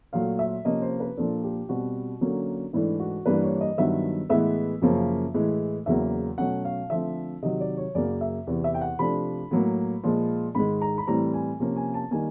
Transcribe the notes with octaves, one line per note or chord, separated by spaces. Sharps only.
A#2 F#3 A3 F5
E5
C3 F3 A#3 C#4 D#5
C5
B4
A#2 F3 A#3 D4 A4
G4
B2 G3 C4 F#4
D3 F#3 A#3 C#4
G#2 E3 A3 D4 E4
F#4
G2 E3 G3 A#3 D4 B4
C#5
D#5
G2 D#3 F#3 B3 E5
A2 E3 G#3 B3 E5
F#2 C#3 F3 A#3 C#4
A2 E3 G#3
E2 C#3 F#3 A#3 E5
B2 F#3 A3 C#4 F#5
F5
D3 F3 A3 C4 E5
C3 D#3 F#3 D#5
D5
C#5
F#2 C#3 F#3 A#3 D5
E5
E2 C3 E3
E5
G5
F#5
C3 F3 A3 D4 B5
A2 F#3 A#3
A#2 F3 G#3
G#2 D#3 G#3 B5
A#5
B5
A2 E3 G3 C4 A#5
G#5
C3 F3 A#3 C#4
G#5
A5
D#3 G3 A#3 G#5